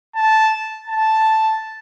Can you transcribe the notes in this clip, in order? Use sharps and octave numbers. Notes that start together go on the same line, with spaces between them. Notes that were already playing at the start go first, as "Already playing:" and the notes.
A5
A5